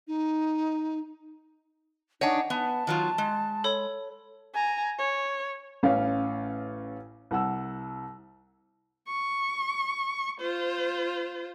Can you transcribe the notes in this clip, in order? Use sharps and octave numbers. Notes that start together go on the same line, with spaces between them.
D#4
D4 D#4 C#5 D#5 F#5 G#5
B3 A5
D#3 F#3 F4
G#3
A4 C#5 B5
G#5 A#5
C#5
A1 C#4 F5
C2 F#5 E6
C#6
F4 C5